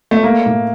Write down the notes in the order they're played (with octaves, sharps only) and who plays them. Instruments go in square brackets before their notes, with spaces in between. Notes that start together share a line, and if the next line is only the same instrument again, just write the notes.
[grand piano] A3
[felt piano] A3 [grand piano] A#3
[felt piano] A2